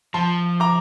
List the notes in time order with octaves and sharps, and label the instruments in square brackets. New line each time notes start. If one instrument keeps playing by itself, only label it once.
[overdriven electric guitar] F3 [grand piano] A5 C6
[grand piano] A#5 D6